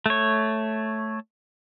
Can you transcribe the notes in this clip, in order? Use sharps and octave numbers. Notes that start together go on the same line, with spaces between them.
A3 C#5